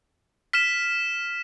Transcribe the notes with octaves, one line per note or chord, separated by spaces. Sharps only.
F6 B6 E7